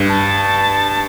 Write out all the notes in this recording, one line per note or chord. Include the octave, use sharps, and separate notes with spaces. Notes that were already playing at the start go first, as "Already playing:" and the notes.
Already playing: G2
A5